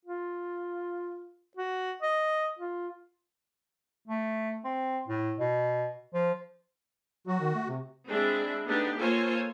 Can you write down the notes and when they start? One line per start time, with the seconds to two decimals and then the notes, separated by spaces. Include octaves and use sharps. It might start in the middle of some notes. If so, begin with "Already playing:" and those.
0.05 F4
1.57 F#4
2.02 D#5
2.59 F4
4.08 A3
4.64 C4
5.08 A2
5.39 B2
6.14 F3
7.27 F#3 F#4
7.40 D#3
7.55 A3
7.68 C3
8.07 G#3 C4 D4 E4 E5
8.66 A3 B3 D4 D#4 G4
8.99 A#3 F4 A4 C5 C#5 G#5